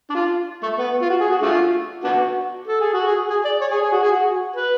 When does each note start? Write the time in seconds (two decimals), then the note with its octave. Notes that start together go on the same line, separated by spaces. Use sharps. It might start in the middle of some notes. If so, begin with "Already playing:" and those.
0.10 D4
0.15 F4
0.63 A3
0.79 B3
1.01 F4
1.10 F#4
1.21 G#4
1.31 F#4
1.42 A3 D4 F4
2.04 B3 D4 F#4
2.67 A4
2.81 G#4
2.93 F#4
3.07 G#4
3.30 G#4
3.45 D5
3.61 C#5
3.72 G#4
3.82 G#4
3.92 F#4
4.03 G#4
4.12 F#4
4.56 B4